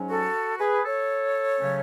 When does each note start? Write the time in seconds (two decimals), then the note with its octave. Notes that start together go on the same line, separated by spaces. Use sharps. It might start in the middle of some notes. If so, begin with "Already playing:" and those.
Already playing: G#2 F#3 C#4
0.09 F#4 A4
0.59 G#4 B4
0.84 A4 C#5
1.60 C#3 F#3 A3 C#4